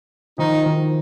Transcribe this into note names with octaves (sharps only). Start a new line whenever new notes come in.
D#3 F3 D#4
D#3 F3